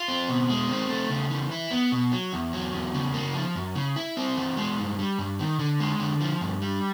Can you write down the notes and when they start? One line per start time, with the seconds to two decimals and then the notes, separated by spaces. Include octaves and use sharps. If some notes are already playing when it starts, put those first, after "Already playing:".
Already playing: F4
0.08 C4
0.29 B2
0.49 G#3
0.69 C4
0.89 A3
1.10 C#3
1.30 E3
1.51 E4
1.71 B3
1.92 B2
2.12 F#3
2.33 E2
2.53 F#3
2.74 E2
2.94 C#3
3.14 A#3
3.34 F3
3.56 F#2
3.75 C#3
3.96 E4
4.17 C4
4.37 E3
4.57 G#3
4.78 G2
4.99 G3
5.19 G2
5.39 D#3
5.59 D3
5.80 G#3
6.00 D3
6.21 F3
6.41 G2
6.62 G3